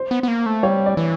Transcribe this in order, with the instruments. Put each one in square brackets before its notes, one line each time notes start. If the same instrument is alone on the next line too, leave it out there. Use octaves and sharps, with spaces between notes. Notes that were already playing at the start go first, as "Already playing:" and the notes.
Already playing: [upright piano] C5
[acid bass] B3
B3
A#3
A3
[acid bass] G3 [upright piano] C#5
[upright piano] D5
[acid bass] E3